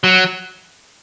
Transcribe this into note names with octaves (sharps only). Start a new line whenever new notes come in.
F#3